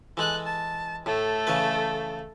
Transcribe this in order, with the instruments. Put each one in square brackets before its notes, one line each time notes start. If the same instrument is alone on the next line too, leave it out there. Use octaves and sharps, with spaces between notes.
[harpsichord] E3 G#3 [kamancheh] A4 F#6
[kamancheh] A5
[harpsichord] A2 [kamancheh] A3 A4
[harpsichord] C#3 E3 B4